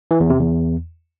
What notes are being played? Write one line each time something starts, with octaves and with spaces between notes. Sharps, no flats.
E3
E2
C3
E2